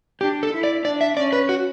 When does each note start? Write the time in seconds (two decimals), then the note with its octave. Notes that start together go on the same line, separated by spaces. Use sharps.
0.21 D4 G4
0.43 A4
0.53 E4
0.63 D5
0.85 D4 D5
1.01 E5
1.17 C#4 D5
1.33 B4
1.49 F#4